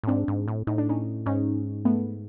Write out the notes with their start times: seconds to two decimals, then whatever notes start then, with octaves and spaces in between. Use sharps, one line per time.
0.03 A2
0.08 G#2 C4 D4
0.28 G#2
0.48 A2
0.67 A2 D#4
0.78 D4
0.89 C#4 D#4
1.26 G#2 C#4 D#4
1.85 A3 B3